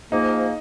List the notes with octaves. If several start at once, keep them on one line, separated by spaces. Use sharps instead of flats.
G#2 F3 A#3 D#4